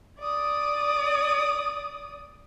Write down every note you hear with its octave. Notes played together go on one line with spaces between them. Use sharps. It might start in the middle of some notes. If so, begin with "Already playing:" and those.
D5 D#6